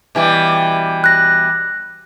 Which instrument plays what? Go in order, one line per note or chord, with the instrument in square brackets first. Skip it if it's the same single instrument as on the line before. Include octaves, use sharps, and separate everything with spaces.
[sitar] B2 E3 G3
[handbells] F#6 A#6